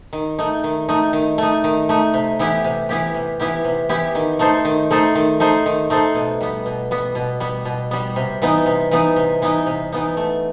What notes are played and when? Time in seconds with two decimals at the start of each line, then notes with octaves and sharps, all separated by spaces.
0.13 D#3
0.39 A3 D#4
0.64 D#3
0.89 A3 D#4
1.13 D#3
1.38 A3 D#4
1.64 D#3
1.89 A3 D#4
2.14 C3
2.39 E3 B3 E4 G4
2.64 C3
2.89 E3 B3 E4 G4
3.14 C3
3.40 E3 B3 E4 G4
3.65 C3
3.89 E3 B3 E4 G4
4.15 D#3
4.39 A3 D#4 A4 C5
4.65 D#3
4.91 A3 D#4 A4 C5
5.15 D#3
5.40 A3 D#4 A4 C5
5.66 D#3
5.90 A3 D#4 A4 C5
6.15 B2
6.41 G3 B3
6.66 B2
6.91 G3 B3
7.15 B2
7.40 G3 B3
7.65 B2
7.91 G3 B3
8.16 C3
8.42 E3 B3 D#4
8.66 C3
8.91 E3 B3 D#4
9.16 C3
9.42 E3 B3 D#4
9.66 C3
9.92 E3 B3 D#4
10.17 A3